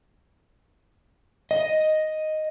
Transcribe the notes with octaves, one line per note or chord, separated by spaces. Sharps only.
D#5